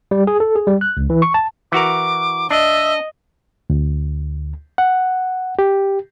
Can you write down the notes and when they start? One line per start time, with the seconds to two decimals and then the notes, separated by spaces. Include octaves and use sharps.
0.11 G3
0.27 G#4
0.40 A4
0.56 G#4
0.67 G3
0.81 F#6
0.97 C#2
1.10 E3
1.22 C#6
1.34 A5
1.72 E3 F#4 A#4 D6
2.50 D4 D#5 E5
3.70 D2
4.78 F#5
5.59 G4